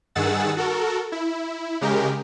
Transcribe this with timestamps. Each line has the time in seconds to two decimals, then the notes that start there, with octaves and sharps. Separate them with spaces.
0.15 G2 D#3 G#4 F#5 E6 A6
0.57 F#4 A4 A#4
1.12 E4
1.81 C#3 G#3 G4 A#4